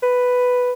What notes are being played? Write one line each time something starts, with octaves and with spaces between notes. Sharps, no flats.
B4